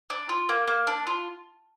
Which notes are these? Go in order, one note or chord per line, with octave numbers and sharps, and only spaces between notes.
D4
F4
A#3
A#3
D4
F4